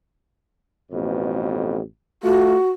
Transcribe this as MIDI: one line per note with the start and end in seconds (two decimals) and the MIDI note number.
0.92 1.81 33
0.92 1.81 41
0.92 1.81 47
2.23 2.55 57
2.23 2.55 65
2.23 2.70 66